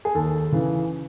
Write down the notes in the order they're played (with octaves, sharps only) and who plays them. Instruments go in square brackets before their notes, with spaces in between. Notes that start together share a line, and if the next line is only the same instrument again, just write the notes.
[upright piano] G#4
D#2 A4
C#3 E3